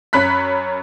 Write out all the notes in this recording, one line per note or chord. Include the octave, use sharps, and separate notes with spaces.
F#2 C#4 B5 F#6 B6